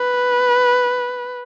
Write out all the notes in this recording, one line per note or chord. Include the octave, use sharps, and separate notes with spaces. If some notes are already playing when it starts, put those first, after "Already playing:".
Already playing: B4